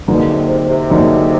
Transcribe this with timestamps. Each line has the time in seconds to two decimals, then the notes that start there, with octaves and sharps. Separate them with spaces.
0.07 B2 D3 F#3 A#3 D#4 G#4
0.28 C3
0.48 C3
0.69 C3
0.90 D3 F#3 A#3 D#4 G#4